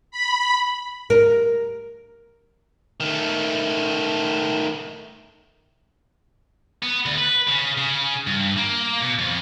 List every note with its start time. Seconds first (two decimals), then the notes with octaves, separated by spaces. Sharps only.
0.11 B5
1.10 A#4
3.00 D#3 A3
6.83 B3
7.06 D2
7.18 B4
7.48 C#3
7.78 C#3
8.27 G2
8.57 A#3
9.02 B2
9.19 F2